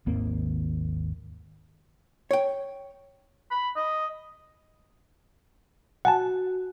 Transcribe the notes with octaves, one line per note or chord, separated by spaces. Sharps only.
G#1 D#2 A#3 C4
C#5 G5
B5
D#5
F#4 F#5 G#5 A5